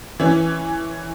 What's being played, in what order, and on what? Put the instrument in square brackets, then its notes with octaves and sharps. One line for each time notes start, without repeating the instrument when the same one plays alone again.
[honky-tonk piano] E3 C#4